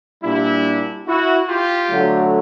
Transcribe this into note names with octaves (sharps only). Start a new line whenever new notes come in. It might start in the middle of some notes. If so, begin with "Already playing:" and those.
A#2 G3 D4 E4
E4 F#4
F4 G4
D3 F#3 A3